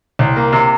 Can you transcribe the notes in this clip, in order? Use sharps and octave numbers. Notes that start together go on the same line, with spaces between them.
C2
A#3
C3